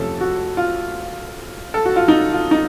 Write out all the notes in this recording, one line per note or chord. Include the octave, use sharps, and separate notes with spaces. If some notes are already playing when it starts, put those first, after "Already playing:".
Already playing: F2 C3 F3 A3 C#4 A4
F#4
F4
A4
F#4
F4
D#4
F4
D#4